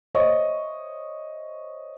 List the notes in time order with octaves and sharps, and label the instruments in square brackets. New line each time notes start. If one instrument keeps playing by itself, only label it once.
[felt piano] C5 C#5 D#5 E5 C#6